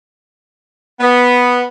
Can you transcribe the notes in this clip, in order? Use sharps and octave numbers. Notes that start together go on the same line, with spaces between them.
B3